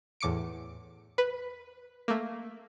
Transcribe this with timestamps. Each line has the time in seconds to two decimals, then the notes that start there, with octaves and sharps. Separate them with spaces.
0.20 E2 A2 D6 C#7 D7
1.18 B4
2.08 A3 A#3